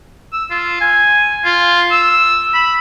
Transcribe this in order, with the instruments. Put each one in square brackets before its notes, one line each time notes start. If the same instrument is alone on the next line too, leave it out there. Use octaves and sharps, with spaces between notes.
[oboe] E6
F4
G#5
F4
E6
B5